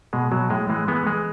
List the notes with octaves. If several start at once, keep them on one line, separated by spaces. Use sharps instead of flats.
B2 G#3
B2 F#3
A2 G#3
E3 G#3
E3 G#3 B3
E3 G#3